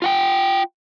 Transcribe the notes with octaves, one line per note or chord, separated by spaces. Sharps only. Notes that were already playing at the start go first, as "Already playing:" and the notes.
F4 F#5 G5